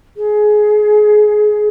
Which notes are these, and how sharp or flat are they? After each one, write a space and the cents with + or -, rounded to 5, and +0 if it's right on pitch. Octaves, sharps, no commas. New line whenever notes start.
G#4 +20